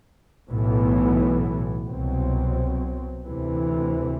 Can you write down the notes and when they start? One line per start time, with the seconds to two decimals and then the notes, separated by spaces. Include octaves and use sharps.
0.49 B1 A2 E3 B3
1.88 C2 B2 F#3 C4
3.26 D2 C3 E3